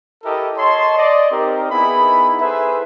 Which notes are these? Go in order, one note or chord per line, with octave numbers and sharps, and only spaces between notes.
E4 G4 A4 A#4 D#5
C#5 D#5 A5 C6
D5 D#5
C4 D#4 G4 A#4
B3 D#4 E4 G#4 B5
E4 G#4 A4 B4 C5 E5